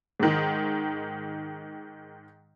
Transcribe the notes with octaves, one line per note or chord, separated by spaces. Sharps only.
G#2 D#3